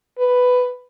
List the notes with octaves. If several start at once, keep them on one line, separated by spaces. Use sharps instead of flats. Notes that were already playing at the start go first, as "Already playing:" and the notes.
B4